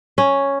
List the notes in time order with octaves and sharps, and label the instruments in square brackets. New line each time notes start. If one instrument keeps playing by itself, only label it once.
[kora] C#4